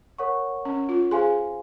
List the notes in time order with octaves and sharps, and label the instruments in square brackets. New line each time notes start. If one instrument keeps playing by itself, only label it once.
[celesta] A#4 C#5 F#5 C#6
[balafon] C#4
F4
[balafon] G#4 [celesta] C5 F5 G#5 C6